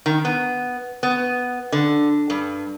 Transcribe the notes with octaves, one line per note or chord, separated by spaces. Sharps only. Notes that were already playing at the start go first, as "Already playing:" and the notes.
D#3
B3
B3
D3
G2